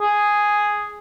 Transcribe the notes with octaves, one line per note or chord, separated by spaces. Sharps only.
G#4